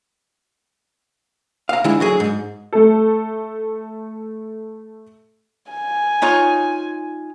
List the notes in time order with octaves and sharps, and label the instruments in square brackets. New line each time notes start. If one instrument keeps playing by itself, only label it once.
[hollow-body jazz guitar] F5 A#5
D3 G#3 E4
D3 F#3 G#4
G#2
[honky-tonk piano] A3 A4
[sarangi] G#5
[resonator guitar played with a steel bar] D#4 F4 C#5